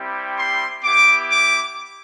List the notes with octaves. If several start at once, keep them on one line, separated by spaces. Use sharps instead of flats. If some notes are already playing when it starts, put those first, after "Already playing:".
Already playing: G3 C4 E4 G4
C6
B3 E4 G4 D6
D6